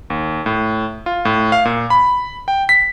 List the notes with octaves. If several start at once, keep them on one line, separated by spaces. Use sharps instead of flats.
D#2
A2
F4
A2
F5
A#2
B5
G5
B6